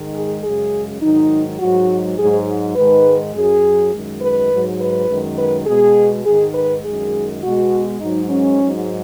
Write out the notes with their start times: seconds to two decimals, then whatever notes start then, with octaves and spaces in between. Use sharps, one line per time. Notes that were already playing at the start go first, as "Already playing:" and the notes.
Already playing: G#2 D#3 G#3
0.14 G#4
0.43 F#2 C#3 G#3 G#4
1.02 G#2 D#3 F#3 D#4
1.60 G#2 F#3 F#4
2.18 G#2 F#3 G#4
2.76 G#2 D#3 G#3 B4
3.35 F#2 F#3 G#4
3.93 F#2 D#3 G#3
4.22 B4
4.52 G#2 F#3
4.80 B4
5.09 F#2 D#3 G#3
5.39 B4
5.67 B2 G#3 G#4
6.25 G#2 D#3 G#3 G#4
6.55 B4
6.84 F#2 D#3 G#3 G#4
7.43 B2 G#3 F#4
8.00 G#2 F#3 D#4
8.29 C#4
8.59 G#2 F#3